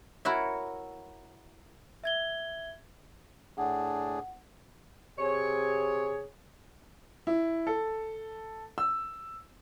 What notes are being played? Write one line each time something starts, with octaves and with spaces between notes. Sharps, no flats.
E4 F#4 A#4 C#5 E5
E5 G#6 G7
A2 D4 G#4 F#5
C3 G#4 C#5
E4
A4
E6